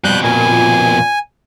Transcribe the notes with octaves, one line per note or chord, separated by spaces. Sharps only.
F2 B2 G3 F#6 G6
A#2 G#5